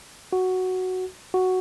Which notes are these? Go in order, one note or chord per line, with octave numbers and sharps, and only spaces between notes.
F#4
F#4